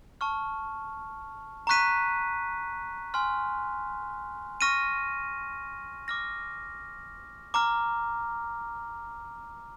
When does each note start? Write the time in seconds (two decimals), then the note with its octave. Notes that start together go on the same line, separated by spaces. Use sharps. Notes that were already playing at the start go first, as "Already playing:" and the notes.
0.21 A5 C#6 F6
1.67 A#5 C#6 F#6 B6 D#7
3.14 G#5 C6 F6
4.61 C#6 F6 A#6 D#7
6.08 D6 F6 A#6
7.54 A#5 D6 F6